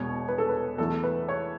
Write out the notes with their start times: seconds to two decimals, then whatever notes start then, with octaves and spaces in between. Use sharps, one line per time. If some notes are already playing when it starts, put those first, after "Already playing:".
Already playing: E1 E2 B2 C#5
0.28 B4
0.38 A4
0.49 B4
0.78 E2 E3 A3 A4
1.03 B4
1.29 C#5